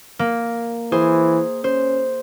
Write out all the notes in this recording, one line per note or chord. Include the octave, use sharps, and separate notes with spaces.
A#3
E3 G#4 C5
C#4 C5